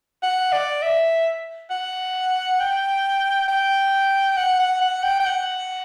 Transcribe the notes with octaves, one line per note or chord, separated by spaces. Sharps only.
F#5
D5
E5
F#5
G5
G5
F#5
F#5
F#5
G5
G5
F#5